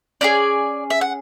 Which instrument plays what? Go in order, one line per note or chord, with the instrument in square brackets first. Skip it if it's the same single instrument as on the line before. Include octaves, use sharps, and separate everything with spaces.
[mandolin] C#4 E4 G#4 D5
E5
F#5